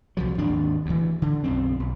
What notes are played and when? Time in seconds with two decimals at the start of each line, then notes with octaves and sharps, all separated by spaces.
0.17 C2 F3 F#3
0.38 G#1 D#2 D4
0.86 D2 E3
1.22 D3
1.44 B1 F#2 C4
1.80 B1